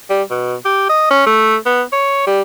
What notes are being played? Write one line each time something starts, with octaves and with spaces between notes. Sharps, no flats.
G3
B2
G4
D#5
C#4
A3
B3
C#5
G3